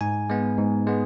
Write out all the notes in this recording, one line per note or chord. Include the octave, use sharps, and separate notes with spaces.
G#2 G#5
G#3 B3
G#2
G#3 B3